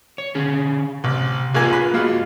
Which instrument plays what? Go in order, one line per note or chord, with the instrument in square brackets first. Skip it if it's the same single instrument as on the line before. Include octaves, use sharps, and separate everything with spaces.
[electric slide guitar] C#5
D3 C#4 G#4
[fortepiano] A1 [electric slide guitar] C3
[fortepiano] A1 A#3 G#5 [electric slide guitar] F4 G#4
[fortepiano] B4
[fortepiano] G#3 F4 [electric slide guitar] A#3 F#4